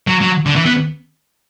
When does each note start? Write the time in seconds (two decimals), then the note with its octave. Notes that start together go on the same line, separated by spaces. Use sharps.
0.07 F#3
0.21 F#3
0.46 D3
0.56 E3
0.65 B3